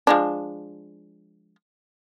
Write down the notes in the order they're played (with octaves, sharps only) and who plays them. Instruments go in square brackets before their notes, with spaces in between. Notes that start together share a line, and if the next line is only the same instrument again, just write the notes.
[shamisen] F3 G#3 D4